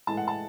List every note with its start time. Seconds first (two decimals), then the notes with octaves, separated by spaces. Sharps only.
0.07 A2 E3 G#3 A5
0.17 F#5
0.28 A5